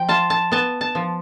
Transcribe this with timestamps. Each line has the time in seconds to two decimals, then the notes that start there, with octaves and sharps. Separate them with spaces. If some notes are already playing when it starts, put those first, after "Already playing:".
Already playing: F3 G5
0.09 F4 A5
0.30 A5
0.52 B3 A5
0.81 A5
0.95 F3